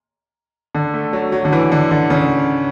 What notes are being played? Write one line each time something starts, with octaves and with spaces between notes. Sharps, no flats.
D3
A3
F#3
F#3
D3
E3
D3
D3
C#3